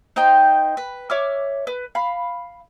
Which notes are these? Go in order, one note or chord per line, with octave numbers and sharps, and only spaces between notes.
D#4 C5 D#5 G5
B4
C#5 E5 D6 F6
B4
F5 B5